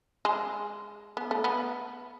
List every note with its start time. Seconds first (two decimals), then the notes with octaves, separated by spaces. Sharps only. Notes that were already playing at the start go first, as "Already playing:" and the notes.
0.25 G#3
1.17 B3
1.31 A3
1.44 B3